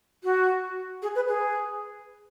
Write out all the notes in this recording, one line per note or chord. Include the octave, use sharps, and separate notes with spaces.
F#4
G#4
B4
G#4